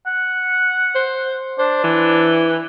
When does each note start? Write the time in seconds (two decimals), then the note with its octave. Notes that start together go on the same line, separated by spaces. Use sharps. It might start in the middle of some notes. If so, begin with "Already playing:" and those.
0.06 F#5
0.95 C5
1.59 D4 C5
1.84 E3